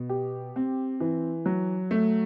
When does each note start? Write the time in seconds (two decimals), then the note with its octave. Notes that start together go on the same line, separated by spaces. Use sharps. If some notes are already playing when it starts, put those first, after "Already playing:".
Already playing: B2
0.09 G4
0.56 C4
1.00 E3
1.46 F#3
1.91 A3